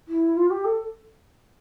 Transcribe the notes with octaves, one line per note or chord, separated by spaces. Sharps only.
E4
F4
G4
A4